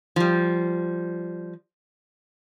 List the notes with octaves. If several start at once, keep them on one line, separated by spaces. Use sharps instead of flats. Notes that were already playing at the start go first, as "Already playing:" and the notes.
F3 G3